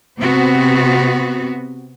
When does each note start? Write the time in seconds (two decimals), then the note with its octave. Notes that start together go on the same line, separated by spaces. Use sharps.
0.21 C3 B3 C4 F#4